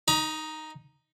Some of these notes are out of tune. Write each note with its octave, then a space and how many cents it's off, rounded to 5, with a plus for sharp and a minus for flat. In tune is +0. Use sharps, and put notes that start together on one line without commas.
D#4 +0 A#5 +40